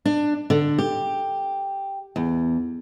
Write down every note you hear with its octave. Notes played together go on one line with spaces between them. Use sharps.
D4
D3
G4
E2